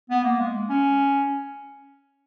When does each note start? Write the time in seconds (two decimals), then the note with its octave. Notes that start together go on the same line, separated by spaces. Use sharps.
0.10 B3
0.24 A#3
0.39 G#3
0.69 C#4